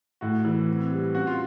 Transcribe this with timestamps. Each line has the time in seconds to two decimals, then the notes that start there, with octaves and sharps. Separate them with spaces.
0.21 A2 F#4
0.45 E3
0.69 C4
0.92 G3
1.15 C#4 F#4
1.27 F4